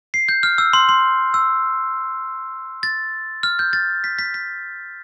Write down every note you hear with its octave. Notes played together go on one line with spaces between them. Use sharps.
C7
G6
F6
E6
C6
C6
E6
A6
F6
G6
A6
B6
B6
B6